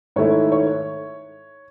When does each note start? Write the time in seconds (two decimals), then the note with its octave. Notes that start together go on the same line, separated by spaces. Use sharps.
0.16 G#2 D#3 A3 E4 C#5
0.52 C#5